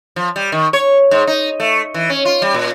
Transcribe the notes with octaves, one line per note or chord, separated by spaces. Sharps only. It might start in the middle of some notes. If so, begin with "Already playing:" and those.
F3
G3
D#3
C#5
G#2
D#4
A3
E3
C#4
F4
G3
A#2